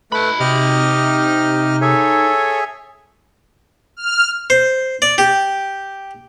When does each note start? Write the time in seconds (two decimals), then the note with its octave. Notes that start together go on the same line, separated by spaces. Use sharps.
0.12 A3 D#4 B4 B5
0.40 C3 G4 D#5 F6
1.81 G#4 A4 C#5 E5 G#5
3.97 F6
4.50 C5
5.02 D5
5.18 G4